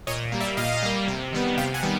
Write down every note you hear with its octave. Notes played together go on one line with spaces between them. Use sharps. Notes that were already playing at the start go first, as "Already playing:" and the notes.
A#2 C#5 D#5
G3 A#3
D5 E5
A#2 D#5 F5
G3 A#3
C3
D#3 G3 B3
C3 F5 G5
F#5 G#5
D#3 G3 B3